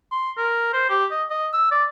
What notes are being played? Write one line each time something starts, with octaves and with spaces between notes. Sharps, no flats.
C6
A#4
C5
G4
D#5
D#5
E6
D5